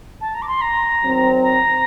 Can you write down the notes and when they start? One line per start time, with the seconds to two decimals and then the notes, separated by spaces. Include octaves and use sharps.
0.21 A5
0.34 A#5
0.42 D6
0.48 C6
0.61 A#5
1.02 D#3 F#3 C4
1.43 A#5